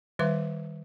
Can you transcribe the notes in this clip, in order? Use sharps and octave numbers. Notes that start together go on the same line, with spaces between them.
D#3 G3 B4 E5 D6